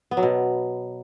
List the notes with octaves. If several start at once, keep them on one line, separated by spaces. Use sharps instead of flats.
B3
F#3
B2